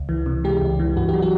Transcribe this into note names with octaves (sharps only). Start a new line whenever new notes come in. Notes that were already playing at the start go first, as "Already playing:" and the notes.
Already playing: C#2
E3
C3
G#3 G4
C#2
E3
G2 F#4
F#3 G4
F#4